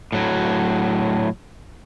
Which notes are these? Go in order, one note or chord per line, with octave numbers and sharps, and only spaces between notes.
A2 F#3